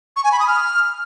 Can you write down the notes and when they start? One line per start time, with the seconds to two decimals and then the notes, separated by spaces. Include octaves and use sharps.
0.16 C#6
0.24 G#5
0.32 B5
0.40 D#6
0.48 F6